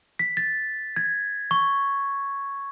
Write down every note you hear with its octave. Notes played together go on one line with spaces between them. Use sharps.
B6
A6
G#6
C#6